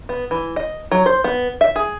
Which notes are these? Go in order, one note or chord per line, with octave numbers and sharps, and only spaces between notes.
B3
E3
D#5
F#3
C5
B3
E5
G#4